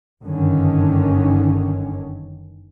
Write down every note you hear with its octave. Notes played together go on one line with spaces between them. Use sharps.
F#1 G2 D3 D#3 C#4